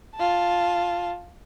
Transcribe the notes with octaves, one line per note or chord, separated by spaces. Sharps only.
F4 A5